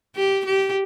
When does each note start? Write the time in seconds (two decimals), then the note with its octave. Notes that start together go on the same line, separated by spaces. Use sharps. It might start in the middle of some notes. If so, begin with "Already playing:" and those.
0.16 G4
0.46 G4